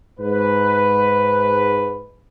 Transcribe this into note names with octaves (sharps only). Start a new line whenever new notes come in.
G#2 B4